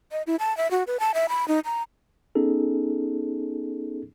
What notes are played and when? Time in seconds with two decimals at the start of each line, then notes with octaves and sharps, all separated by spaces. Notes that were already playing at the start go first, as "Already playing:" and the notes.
0.12 D#5
0.27 E4
0.40 A5
0.57 E5
0.71 F#4
0.87 B4
1.00 A5
1.14 E5
1.29 B5
1.48 D#4
1.65 A#5
2.35 B3 C#4 D#4 G#4 A4